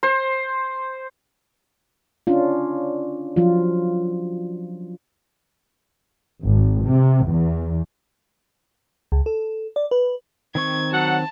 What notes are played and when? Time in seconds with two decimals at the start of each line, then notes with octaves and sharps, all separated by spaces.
0.03 C5
2.27 C#4 D4 F4
3.36 F3 F#3 F4
6.44 G#1
6.86 C3
7.27 E2
9.12 C#2
9.26 A4
9.76 D5
9.91 B4
10.55 D#3 C4 C#6 G#6
10.92 F#3 F#5 A5